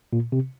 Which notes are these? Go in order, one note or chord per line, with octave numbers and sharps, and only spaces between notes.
A#2
C3